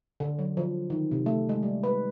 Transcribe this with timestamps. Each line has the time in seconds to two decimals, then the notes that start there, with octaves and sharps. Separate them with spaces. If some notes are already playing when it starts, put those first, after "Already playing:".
0.20 D3
0.39 F#3
0.57 F3
0.90 D#3
1.11 C3
1.26 A3
1.49 G#3
1.63 G3
1.83 B4